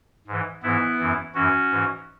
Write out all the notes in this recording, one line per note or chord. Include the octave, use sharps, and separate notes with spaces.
G#2 E3
G#2 E3 B3 E4
F#2 E3
F#2 E3 C#4 F#4
G#2 E3